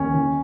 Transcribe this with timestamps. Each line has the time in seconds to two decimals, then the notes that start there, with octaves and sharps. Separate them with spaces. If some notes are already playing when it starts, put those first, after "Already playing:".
Already playing: D#2 C#4
0.14 D#3